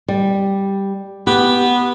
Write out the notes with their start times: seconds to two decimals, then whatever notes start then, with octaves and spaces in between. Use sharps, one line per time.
0.08 G3
1.27 B3 G4